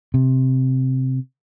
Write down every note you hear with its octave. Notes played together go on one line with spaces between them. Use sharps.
C3